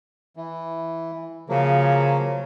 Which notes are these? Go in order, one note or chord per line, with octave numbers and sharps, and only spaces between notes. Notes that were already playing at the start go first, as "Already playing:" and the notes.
E3
C#3 F3 F#3 A#3